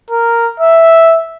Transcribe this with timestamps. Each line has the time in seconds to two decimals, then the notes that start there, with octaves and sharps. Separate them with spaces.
0.11 A#4
0.60 E5